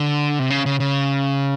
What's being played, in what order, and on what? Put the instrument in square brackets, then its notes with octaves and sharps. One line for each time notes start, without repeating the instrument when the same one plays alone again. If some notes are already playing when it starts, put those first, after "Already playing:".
Already playing: [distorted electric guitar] D3
C3
C#3
C#3
C#3